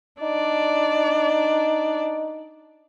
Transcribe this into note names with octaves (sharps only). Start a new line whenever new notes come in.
D4 D#4 D5